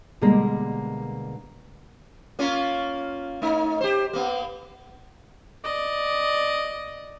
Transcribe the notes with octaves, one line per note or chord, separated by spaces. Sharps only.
B2 D3 G3 G#3 A#3 A#4
A#3 C#4 F4
A3 D#4
G4 C5
A#3 B3
D5 D#5